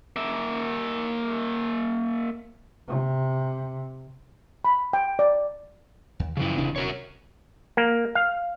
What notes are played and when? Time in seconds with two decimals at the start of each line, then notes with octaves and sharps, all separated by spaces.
0.16 A#3 E5
2.88 C3
4.65 B5
4.93 G5
5.19 D5
6.20 D#2
6.37 F#2 C#3 E3 F3 E4
6.58 D#1 C3 D4
6.76 F#4 A#4 C#5
7.77 A#3
8.15 F5